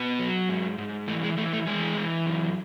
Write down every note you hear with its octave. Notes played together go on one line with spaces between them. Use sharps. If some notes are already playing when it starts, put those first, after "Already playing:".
Already playing: B2 B3
F#3
G#2
G#2
E3 A3
G#3
E3 A3
A3
E3 G#3 G#4
E3
F#2